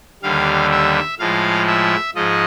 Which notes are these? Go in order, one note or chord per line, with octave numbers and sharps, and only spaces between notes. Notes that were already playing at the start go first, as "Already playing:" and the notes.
D#2 D3 G3 F5
E5
A2 F3 G#3 F5
E5
G#2 F3 G#3 D#5